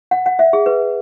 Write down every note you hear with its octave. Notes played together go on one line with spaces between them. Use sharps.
F#5
F#5
E5
G#4
B4